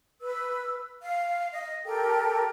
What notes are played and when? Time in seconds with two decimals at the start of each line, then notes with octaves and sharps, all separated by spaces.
0.21 B4 E6
1.02 F5
1.52 D#5
1.85 G4 A4 A#4 G5